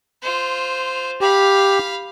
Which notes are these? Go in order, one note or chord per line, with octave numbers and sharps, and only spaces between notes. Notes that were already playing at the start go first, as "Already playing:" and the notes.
F4 C5
G4 F5 B5